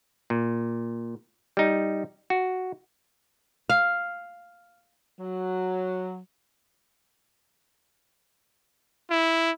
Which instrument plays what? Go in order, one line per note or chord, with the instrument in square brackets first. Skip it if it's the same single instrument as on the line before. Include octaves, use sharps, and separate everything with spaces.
[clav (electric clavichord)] A#2
G3 D#4
F#4
[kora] F5
[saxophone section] F#3
[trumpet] E4